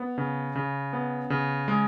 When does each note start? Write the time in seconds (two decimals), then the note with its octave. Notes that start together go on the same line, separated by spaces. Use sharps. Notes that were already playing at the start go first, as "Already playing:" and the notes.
Already playing: B3
0.18 C#3
0.55 C#3
0.93 B3
1.30 C#3
1.68 G#3